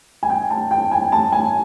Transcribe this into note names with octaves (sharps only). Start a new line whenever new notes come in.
G#5
G5
A5
G5
G#5
A5
G#5